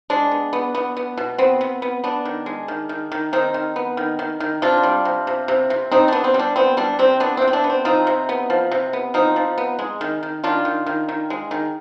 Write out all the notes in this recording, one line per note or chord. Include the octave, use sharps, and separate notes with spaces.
G#3 D4
B3
B3
B3
B3
B2
B3 C4
B3
B3
B3 D4
D#3
G#3
D#3
D#3
D#3
D#3 C4 D#4
D#3
B3
D#3
D#3
D#3
C3 D4 F4
G3
C3
C3
C3
C3
C3 C4 D#4
B3 D4
C4
G3
D4
B3 C4
G3 D4
C3 C4
B3 D4
C4
C3
C4
D4
B3
C4
F3 C4 D#4
C3
B3
F3
C3
B3
F3 C4 D#4
F3
B3
G#3
D#3
D#3
D#3 D4 F4
D#3
D#3
D#3
G#3
D#3